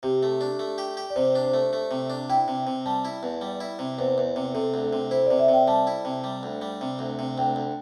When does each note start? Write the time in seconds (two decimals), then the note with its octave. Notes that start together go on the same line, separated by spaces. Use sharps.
0.03 C3 G4
0.23 A3
0.41 D4
0.59 A3
0.78 G4
0.97 G4
1.10 D5
1.16 C3 C5
1.35 D4
1.44 C5
1.54 A3
1.73 A3
1.91 C3
2.10 D4
2.30 E4 G5
2.48 C3
2.67 C3
2.86 G3 A5
3.05 E4
3.23 E2
3.41 G3
3.60 E4
3.79 C3
3.98 E2 C5
4.18 E2
4.36 C3
4.54 C3 A4
4.74 D2
4.83 A4
4.93 C3
5.11 E4 C5
5.26 D5
5.31 C3
5.40 E5
5.49 C3 G5
5.68 G3 A5
5.87 E4
6.05 C3
6.24 G3
6.43 D2
6.61 G3
6.81 C3
6.99 D2
7.19 C3
7.38 D2 G5
7.56 D2